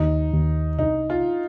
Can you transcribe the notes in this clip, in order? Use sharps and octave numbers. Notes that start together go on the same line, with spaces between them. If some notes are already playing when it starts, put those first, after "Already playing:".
Already playing: D#2 D#4
D#2
C2 D#4
F4